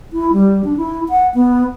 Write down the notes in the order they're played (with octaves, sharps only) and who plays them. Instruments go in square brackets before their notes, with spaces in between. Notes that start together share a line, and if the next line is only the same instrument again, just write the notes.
[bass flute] E4
G3
D4
E4
F#5
B3